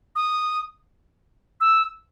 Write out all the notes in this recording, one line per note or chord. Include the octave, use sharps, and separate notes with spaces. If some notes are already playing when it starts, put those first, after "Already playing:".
D#6
E6